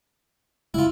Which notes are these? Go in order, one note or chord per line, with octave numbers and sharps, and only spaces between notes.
F#2 C#3 G#3 E4 F4